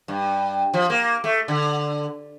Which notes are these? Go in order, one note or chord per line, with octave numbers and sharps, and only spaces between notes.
G2
F3
A#3
A3
D3